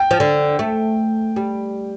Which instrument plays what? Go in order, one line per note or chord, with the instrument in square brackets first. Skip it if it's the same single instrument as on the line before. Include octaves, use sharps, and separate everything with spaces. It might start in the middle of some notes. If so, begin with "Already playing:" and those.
Already playing: [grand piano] G5
[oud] F3
D3
A3
G3